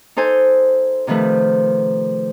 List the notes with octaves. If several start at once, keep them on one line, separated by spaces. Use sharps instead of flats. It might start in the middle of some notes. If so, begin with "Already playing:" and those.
D#4 A4 C5 G#5
C3 D#3 F3 A3 B4